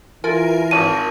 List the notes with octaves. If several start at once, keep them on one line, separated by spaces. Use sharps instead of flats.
E3 F4 A#4 G#5
G#1 A5 D#7